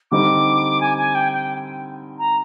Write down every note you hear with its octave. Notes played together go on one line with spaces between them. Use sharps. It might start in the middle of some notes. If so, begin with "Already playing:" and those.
D3 G3 C4 D#4 D6
G#5
G#5
G5
G5
A#5